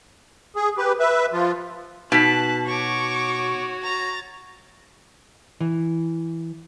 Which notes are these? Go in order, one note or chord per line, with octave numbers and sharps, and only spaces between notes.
G#4
G4 B4
B4 E5
F3 F4
B2 D#4 A5 F#6 B6
F#4 C#5 C#6 D6
A#5 A6
E3